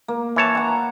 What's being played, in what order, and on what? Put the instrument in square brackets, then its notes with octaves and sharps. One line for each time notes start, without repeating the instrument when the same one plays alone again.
[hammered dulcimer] A#3
[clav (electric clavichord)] E3 C#5 A5
[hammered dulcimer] F#5 A#5